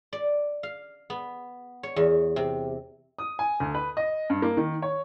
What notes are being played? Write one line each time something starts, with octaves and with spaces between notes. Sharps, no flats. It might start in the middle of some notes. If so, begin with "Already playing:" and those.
D5
F5
B3
C#5
E2
C3
D#6
G#5
D2
B4
D#5
G2
A#3
D#3
C#5